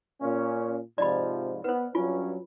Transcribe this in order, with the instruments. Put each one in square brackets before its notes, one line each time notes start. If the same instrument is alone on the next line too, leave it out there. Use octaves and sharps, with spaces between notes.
[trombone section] A#2 C#4
[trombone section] G#2 C3 F3 [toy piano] D5 D#5 B5
[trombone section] B3 [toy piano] B4 C5
[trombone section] G2 F#3 C#4 [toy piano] F4